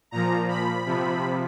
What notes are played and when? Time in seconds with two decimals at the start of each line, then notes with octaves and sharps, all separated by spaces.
0.11 A#2 F3 A#5
0.49 B5
0.86 C3 F3